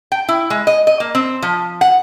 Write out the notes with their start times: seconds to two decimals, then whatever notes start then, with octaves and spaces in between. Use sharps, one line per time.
0.12 G5
0.28 E4
0.50 G#3
0.67 D#5
0.87 D#5
1.00 A#3
1.15 C4
1.42 F3
1.81 F#5